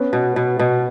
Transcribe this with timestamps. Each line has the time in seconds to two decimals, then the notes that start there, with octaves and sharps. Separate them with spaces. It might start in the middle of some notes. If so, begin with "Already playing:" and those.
Already playing: B3 C#4
0.13 B2
0.36 B2
0.59 B2